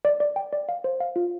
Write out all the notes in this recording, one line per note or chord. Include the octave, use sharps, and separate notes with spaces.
D5
D5
G5
D5
F5
C5
F5
F4